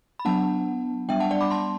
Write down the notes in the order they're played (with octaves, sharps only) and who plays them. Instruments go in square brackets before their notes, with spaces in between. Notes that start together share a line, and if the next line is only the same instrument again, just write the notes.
[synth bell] B5
F#3 B3 D4 F#5 A5
G3 B3 D4 E5 G5
F#5 A5
D5 F#5
B5 D6
A5 C6